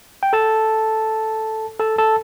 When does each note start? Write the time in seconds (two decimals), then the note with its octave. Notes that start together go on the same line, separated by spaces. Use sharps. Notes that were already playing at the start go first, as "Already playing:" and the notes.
0.23 G5
0.33 A4 A5
1.80 A4 A5
1.99 A4 A5